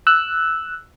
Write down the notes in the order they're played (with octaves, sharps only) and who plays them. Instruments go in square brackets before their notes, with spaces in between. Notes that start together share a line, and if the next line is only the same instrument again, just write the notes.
[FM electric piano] E6 F#6